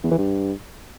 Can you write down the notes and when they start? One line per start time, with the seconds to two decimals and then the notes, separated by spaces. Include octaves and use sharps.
0.04 E2
0.11 E3
0.18 G2